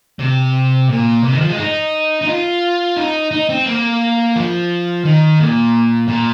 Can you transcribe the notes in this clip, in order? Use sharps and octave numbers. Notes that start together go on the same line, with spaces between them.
C3
A#2
C3
D#3
F3
G#3
D#4
D#4
F4
D#4
D#4
C4
A#3
F3
D#3
A#2
A#2